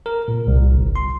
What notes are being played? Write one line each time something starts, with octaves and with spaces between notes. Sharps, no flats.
A#4
A#2
C2
G1
C6